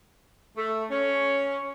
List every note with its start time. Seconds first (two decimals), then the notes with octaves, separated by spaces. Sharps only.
0.56 A3
0.90 C#4